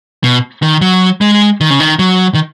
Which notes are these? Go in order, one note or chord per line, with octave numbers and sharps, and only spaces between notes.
B2
D#3
F#3
G#3
D#3
C#3
D#3
F#3
D#3